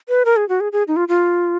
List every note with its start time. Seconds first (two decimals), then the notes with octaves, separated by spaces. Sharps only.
0.09 B4
0.25 A#4
0.37 G#4
0.49 F#4
0.60 G#4
0.72 G#4
0.88 D#4
0.96 F4
1.08 F4